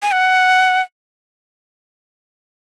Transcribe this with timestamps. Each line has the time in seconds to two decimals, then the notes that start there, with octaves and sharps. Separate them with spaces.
0.02 G#5
0.12 F#5